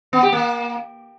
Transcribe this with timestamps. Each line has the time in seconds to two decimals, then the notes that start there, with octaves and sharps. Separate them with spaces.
0.13 B3
0.23 G4
0.32 A#3